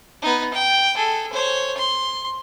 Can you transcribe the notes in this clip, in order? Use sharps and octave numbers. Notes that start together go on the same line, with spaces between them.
B3 D#4
G5
G#4 A4
C5 C#5
C6